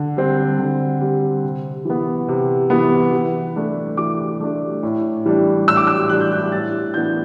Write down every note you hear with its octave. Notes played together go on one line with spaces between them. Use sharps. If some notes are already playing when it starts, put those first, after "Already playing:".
Already playing: D3
G3 C4
D3
G3 C4
C3
E3 B3
C3
E3 B3
E3
A3 D4
E3 D6
A3 D4
A2
E3 G3 D4
A2 E6
D6
E6
E3 G3 D4 F#6
G6
F#6
A2 A6
E3 B3 D4 G6